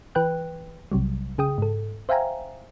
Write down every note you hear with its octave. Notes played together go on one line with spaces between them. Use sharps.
E3 B4 G5 F#6
B1 C3 F#3 G3
C#3 G#4 G5 D#6
G#2 A4
C5 E5 F5 G5 G#5 A#5